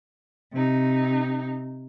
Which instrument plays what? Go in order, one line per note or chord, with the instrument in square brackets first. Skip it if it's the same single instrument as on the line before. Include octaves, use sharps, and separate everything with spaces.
[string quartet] C3 D#4